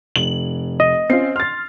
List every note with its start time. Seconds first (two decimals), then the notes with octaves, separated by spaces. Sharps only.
0.16 F1 F#7
0.80 D#5
1.10 C4 C#4 F4 C7
1.36 C6 F6 A6